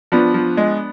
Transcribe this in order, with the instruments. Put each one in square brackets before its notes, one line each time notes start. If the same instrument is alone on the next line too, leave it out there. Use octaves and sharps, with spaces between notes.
[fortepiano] F3 [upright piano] B3 D4
[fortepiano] F3
G#3